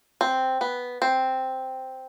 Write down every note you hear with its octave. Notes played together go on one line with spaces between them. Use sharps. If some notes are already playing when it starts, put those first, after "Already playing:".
C4
B3
C4